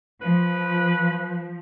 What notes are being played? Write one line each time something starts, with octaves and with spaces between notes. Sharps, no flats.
F3 B4